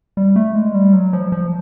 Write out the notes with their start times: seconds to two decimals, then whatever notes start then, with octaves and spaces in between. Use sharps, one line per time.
0.17 G3
0.36 A3
0.55 G#3
0.74 G3
0.93 F#3
1.13 F3
1.32 F3